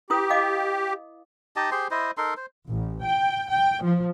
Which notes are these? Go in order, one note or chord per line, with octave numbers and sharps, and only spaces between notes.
E4 G4 B4 D#6
D#5 F5 D6
D#4 G4 D#5 A5
G4 G#4 C5 C6
E4 C5 D#5
D#4 A4 A#4 C6
C5
A1
G5
G5
F3